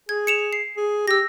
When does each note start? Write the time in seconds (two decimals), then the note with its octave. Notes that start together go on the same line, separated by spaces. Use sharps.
0.09 G#4 G#6
0.27 C#7 E7 F7
0.53 C7
0.77 G#4
1.08 G4 E6 A#6